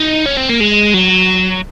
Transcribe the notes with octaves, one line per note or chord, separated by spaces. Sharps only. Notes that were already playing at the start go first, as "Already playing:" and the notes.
Already playing: D#4
C#4
C4
A#3
G#3
F#3